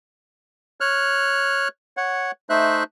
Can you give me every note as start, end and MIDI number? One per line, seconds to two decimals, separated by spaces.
0.81 1.68 73
0.81 1.68 89
0.81 1.68 90
1.97 2.31 73
1.97 2.31 78
2.50 2.84 57
2.50 2.84 63
2.50 2.84 72
2.50 2.84 76
2.50 2.84 90